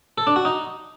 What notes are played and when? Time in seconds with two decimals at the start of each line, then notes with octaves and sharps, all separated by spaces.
0.18 A4
0.27 D4
0.36 F#4
0.45 D#4